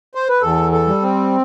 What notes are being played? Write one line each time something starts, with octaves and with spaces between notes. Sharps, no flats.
C5
B4
E2 A4
A4
G3
C4